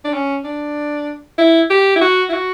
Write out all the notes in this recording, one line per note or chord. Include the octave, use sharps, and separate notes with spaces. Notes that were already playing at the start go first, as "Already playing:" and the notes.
D4
C#4
D4
E4
G4
E4
F#4
E4
F#4